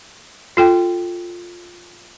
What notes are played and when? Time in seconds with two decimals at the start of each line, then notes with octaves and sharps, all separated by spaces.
0.57 F4 A4 G5